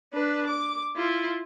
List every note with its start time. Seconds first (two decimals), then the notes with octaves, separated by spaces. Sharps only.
0.13 D4 B4
0.47 D6
0.96 E4 F4